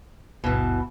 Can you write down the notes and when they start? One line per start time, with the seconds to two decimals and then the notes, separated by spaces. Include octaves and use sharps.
0.44 G#1 D2 G2 B2 E3